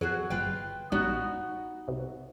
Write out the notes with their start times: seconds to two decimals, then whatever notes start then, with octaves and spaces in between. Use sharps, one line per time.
0.01 F2 F#3 F#4 G#4
0.30 G1 F4 B4 G5
0.92 A#1 G#2 G3 B3 D#4 F#4
1.88 C2